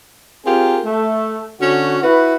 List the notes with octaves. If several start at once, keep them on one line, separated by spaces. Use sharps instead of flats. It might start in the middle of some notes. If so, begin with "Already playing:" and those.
C4 F4 G4 G#4 A#4
A3
D3 C#4 F#4
E4 F#4 B4